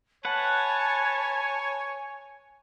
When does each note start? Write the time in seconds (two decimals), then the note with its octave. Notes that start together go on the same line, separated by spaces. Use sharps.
0.25 B4 C#5 F#5 G#5 A5